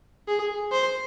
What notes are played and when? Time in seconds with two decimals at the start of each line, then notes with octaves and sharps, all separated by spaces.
0.28 G#4
0.72 C5